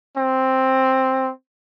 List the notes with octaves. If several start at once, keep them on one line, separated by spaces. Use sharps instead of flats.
C4